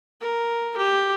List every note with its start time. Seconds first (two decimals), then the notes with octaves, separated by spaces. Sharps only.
0.21 A#4
0.77 G4